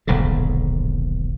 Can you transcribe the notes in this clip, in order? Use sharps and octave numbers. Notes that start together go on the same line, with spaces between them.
D#1 B1 G#2 D3